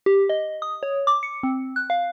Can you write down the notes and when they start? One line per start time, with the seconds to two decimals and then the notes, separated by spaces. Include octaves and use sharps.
0.06 G4
0.29 D#5
0.62 D#6
0.83 C#5
1.07 D6
1.23 C#7
1.43 C4
1.76 F#6
1.90 F5